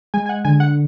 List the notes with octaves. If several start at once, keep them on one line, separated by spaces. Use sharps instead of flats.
G#3 G#5
G#5
F#5
D3 G#5
F#5